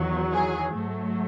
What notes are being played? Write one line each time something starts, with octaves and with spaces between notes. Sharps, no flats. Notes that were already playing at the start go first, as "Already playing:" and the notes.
Already playing: E2 D#3 F#3
G#4
G#2 F#3 A3